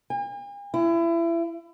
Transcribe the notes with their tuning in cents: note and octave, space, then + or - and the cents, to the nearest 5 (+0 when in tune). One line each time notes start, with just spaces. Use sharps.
G#5 -45
E4 +30